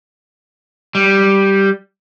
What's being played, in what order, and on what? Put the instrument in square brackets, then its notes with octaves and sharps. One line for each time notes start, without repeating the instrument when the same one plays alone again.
[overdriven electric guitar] G3